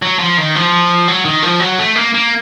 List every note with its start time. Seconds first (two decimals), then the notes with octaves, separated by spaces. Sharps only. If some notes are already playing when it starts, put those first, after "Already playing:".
0.02 F#3
0.19 F3
0.38 D#3
0.55 F3
1.08 F#3
1.25 D#3
1.43 F3
1.60 F#3
1.79 A3
1.96 A#3
2.14 A#3